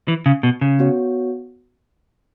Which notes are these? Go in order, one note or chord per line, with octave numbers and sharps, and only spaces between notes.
E3
C#3
B2
C#3
B3 F#4 C#5